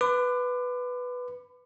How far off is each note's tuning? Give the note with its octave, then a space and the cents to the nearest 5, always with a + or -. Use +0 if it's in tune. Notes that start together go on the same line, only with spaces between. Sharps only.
B4 +0 B5 +35 D6 +25